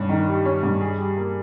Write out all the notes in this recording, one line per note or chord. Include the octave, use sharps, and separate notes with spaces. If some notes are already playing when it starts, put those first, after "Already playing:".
Already playing: G2 C#4
D#3
G3
C#4
G2
G#4
G3
A#3